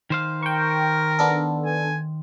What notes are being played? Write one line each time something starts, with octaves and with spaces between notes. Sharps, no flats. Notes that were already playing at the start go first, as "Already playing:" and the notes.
D#3 C5 F5
A#4 G5 C#6
B3 D4 A4
G#5